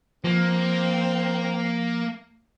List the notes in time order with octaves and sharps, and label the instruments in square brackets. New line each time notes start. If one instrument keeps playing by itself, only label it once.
[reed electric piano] F3 [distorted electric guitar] A#3 [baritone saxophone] C4